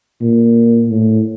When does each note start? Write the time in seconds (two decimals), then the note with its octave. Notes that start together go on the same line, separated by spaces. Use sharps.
0.22 A#2
0.89 A2